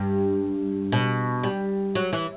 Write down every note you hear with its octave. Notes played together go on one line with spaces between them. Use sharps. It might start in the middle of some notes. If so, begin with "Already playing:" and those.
Already playing: G2
B2
G3
F#3
E3